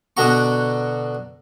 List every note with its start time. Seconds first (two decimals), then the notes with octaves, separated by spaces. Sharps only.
0.17 B2 D3 F#4 A#5 C#6